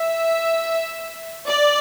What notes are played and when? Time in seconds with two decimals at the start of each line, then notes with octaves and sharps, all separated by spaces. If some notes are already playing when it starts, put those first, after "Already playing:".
Already playing: E5
1.47 D5